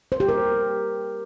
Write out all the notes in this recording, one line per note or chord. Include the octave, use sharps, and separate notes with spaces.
C5
G4
A#4